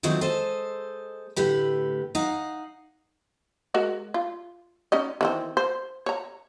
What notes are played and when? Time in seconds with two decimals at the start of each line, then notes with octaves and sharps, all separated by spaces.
0.03 D#3 F3 F#3 A3 C4 D4
0.21 G#3 A4 C5 D#5
1.36 A2 D3 G4 B4
2.15 D#4 F5 F#5
3.74 G#3 F#4 A#4
4.14 F4
4.92 C#4 D#4 D#5
5.21 D#3 E3 C4
5.57 C5
6.06 C#5 A#5